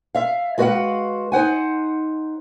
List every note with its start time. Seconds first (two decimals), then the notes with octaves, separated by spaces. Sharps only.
0.15 E5 F5
0.58 G#3 F#4 B4 D5 F5 F#5
1.32 D#4 C5 F#5 G#5